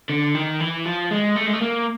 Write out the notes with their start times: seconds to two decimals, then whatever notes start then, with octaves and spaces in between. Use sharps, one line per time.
0.09 D3
0.35 D#3
0.60 E3
0.85 F3
1.11 G#3
1.36 A3
1.47 G#3
1.54 A3
1.62 A#3